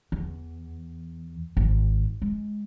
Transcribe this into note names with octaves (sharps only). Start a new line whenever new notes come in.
E2
G#1
G#3